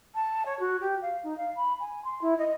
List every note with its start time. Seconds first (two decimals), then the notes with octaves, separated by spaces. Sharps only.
0.15 A5
0.46 C#5
0.59 F#4
0.81 G4
1.02 F5
1.23 D#4
1.37 F5
1.56 B5
1.80 G#5
2.04 C6
2.21 E4
2.38 D#5